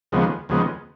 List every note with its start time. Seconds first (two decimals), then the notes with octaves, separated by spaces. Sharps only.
0.12 D#2 C#3 F3 G#3 B3
0.49 D#2 C#3 F3 G#3 B3